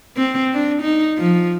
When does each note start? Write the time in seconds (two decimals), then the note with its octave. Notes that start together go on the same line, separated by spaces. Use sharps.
0.17 C4
0.53 D4
0.82 D#4
1.18 F3